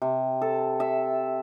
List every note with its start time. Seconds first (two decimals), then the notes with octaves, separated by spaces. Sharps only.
0.02 C3
0.42 A4
0.80 E5